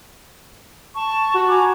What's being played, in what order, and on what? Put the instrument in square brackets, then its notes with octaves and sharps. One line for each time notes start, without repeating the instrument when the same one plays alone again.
[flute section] A5 C#6
[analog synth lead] F#4
[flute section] G#5 A#5 D6